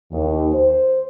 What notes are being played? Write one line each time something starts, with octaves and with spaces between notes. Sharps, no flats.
D#2
C5